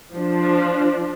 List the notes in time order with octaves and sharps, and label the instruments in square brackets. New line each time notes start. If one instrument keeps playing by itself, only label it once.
[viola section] F3 D4